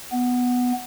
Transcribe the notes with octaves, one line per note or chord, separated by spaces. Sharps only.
B3